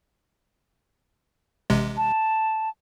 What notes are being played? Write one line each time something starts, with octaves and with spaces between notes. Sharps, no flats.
A1 C3 G#3
A5